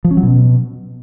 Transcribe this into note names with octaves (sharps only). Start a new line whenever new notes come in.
F3
C#4
F#3
B2